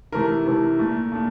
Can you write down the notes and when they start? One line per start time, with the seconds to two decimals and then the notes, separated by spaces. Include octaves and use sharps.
0.12 C3 E3 A3 A#4
0.46 C3 E3 A3
0.79 A#2 A3
1.12 A#2 A3